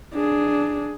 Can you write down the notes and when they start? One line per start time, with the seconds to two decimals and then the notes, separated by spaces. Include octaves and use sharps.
0.14 D4 G#4